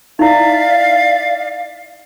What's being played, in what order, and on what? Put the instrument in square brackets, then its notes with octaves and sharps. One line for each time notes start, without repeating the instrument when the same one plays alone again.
[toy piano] D#4 E4 [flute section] D5 E5 F5